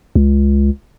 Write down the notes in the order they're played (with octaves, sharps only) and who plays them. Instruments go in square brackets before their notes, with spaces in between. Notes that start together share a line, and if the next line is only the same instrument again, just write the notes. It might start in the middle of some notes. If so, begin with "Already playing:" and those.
[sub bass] C#2